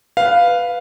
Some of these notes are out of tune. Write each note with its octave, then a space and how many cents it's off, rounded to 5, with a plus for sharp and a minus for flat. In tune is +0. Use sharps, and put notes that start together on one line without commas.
B4 +0 F5 +0